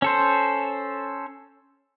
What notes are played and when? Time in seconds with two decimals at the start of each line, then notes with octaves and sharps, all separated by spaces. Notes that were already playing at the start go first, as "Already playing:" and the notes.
0.02 C#4 A4 C5